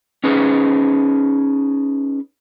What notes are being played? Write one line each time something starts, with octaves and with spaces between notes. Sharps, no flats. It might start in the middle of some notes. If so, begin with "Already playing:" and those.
C#4 D#4 G#4 B4